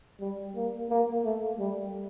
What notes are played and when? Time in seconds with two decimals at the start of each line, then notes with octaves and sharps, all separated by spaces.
0.21 G3
0.56 A#3
0.90 A#3
1.25 A3
1.59 G3